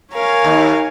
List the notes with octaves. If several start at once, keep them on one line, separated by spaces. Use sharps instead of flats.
A#4 C#5 F5 G#5
D#2